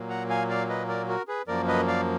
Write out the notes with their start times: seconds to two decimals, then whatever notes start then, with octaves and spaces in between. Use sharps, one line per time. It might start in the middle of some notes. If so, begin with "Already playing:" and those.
Already playing: A#2 F#3 A#3
0.10 F#5 A#5
0.29 F5 G#5
0.49 D5 F5
0.69 B4 D#5
0.88 A#4 D5
1.08 F#4 A#4
1.28 G#4 B4
1.48 F#2 F3 A#3 A#4 D5
1.68 B4 D#5
1.87 D5 F5